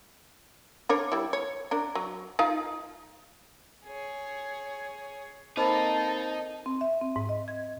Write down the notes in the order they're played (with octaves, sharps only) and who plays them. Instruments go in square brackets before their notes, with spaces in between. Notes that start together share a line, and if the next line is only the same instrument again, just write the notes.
[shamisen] D4 A#4 C#5
G3 E4
C#5
D4 A#4
F#3
D#4 F4 F5
[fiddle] G#4 C#5
[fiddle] A#3 A4 [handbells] C4 C5 B5 [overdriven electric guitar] D#4 [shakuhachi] A5
[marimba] C4
E5
C4
G#2
D#5
G#6